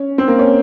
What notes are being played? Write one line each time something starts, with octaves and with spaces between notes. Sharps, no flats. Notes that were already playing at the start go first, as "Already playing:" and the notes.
Already playing: C#4
C4
A#3
C#4